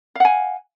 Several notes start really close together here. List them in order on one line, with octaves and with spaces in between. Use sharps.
F5 F#5 G#5